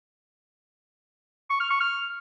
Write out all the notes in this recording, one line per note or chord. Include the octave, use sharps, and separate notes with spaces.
C#6
F6
C#6
F6